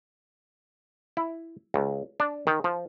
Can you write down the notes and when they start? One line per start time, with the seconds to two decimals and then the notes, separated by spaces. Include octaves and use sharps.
1.17 E4
1.74 C#2
2.20 D4
2.47 D#3
2.64 F3